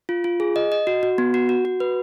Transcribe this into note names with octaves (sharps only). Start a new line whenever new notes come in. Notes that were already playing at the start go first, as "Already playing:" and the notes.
F4
F4
G#4
D#5
D#5
F#4
F#4
B3
F#4
F#4
F#4
B4